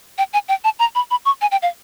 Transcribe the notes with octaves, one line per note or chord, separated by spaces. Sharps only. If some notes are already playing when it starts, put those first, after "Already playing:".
G5
G#5
G5
A5
A#5
B5
B5
C#6
G#5
G5
F5